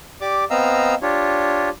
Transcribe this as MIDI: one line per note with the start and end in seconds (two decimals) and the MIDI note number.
0.21 0.44 67
0.21 0.44 74
0.21 0.44 86
0.50 0.95 59
0.50 0.95 60
0.50 0.95 75
0.50 0.95 77
0.50 0.95 82
0.50 0.95 88
1.02 1.69 62
1.02 1.69 65
1.02 1.69 67
1.02 1.69 73